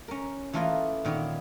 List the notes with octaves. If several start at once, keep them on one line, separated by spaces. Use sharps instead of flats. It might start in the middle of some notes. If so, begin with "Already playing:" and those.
C#4 A#4
E3 A3 A#3 F4 B4 D#5
A#2 D#3 B3 C#5